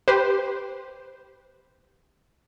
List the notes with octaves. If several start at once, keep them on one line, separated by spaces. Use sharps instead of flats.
G4 B4 C5